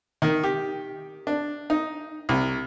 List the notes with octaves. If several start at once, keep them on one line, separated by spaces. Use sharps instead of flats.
D#3
G4
D4
D#4
C2